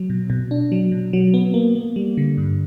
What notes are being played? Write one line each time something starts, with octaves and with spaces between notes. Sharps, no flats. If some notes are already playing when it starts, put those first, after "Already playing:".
Already playing: F#3
B2
B2
D4
F#3
B2
F#3
B3
A#3
A#3
G3
D3
G2